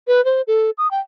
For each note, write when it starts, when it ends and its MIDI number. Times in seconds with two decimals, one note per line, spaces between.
0.08 0.24 71
0.25 0.42 72
0.47 0.70 69
0.78 0.90 87
0.91 1.00 79